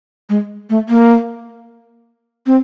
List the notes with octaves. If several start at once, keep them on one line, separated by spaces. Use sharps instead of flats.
G#3
A3
A#3
C4